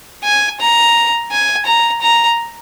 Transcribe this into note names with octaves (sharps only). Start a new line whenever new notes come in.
G#5
A#5
G#5
A#5
A#5